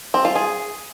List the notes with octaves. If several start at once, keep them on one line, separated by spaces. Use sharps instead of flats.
C4
F4
G#4